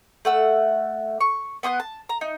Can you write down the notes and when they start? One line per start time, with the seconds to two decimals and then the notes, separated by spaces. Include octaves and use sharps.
0.25 A3 F#5 E6
1.20 C#6
1.63 B3 C6 D#6 F#6
1.80 A5
2.09 A#5
2.21 D#4